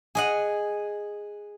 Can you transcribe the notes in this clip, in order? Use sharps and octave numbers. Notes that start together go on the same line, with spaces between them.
G#4 D#5 F#5